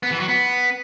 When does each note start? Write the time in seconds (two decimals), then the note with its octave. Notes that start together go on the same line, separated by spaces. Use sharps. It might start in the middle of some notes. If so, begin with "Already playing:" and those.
0.03 B3
0.11 E3
0.20 F#3
0.28 B3